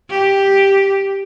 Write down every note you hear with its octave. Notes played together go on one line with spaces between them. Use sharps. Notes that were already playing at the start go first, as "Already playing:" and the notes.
G4